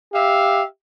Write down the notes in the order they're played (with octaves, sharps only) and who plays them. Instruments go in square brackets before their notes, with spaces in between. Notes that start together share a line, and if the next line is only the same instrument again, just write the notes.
[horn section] G4 E5 F5